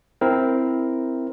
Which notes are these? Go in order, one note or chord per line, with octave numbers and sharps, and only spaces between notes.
C4 E4 A#4